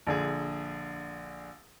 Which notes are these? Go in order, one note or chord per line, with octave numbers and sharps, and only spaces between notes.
A#1 D3 G#4